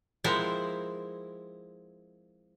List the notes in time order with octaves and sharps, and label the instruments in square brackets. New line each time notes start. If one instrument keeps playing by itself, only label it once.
[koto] F3 G#3 C4 E4 A#4 F#5